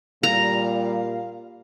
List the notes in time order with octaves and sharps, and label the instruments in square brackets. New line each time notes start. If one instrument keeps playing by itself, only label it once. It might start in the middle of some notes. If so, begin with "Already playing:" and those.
[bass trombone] A#2 [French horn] G3 [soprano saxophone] F5 [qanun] A#5